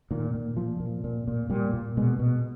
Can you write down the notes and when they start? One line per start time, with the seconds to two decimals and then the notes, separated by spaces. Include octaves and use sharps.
0.11 A#2 D#3
0.35 A#2
0.57 A#2 F3
0.80 A#2
1.04 A#2
1.28 A#2
1.50 A#2 G3
1.73 A#2
1.97 B2 G#3
2.19 B2